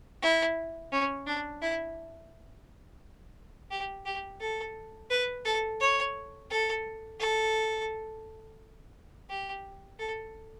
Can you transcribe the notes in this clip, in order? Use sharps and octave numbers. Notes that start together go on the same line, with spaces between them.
E4
C#4
D4
E4
G4
G4
A4
B4
A4
C#5
A4
A4
G4
A4